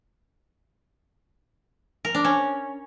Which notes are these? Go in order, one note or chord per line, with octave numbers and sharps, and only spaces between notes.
A#4
D4
C#4